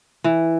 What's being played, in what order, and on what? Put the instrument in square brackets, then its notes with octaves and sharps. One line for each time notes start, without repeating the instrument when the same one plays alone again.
[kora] E3